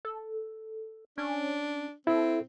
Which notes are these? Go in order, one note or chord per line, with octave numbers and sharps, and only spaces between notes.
A4
C#4 D4
C4 E4 A4